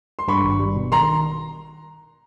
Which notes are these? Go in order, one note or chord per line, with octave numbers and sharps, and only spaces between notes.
C6
G2 B5 C#6
G#1
G3
B2
D#3 A#5 C6